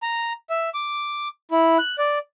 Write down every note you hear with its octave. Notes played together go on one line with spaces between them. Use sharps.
A#5
E5
D6
E4
F#6
D5